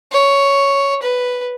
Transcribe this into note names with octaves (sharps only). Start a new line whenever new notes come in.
C#5
B4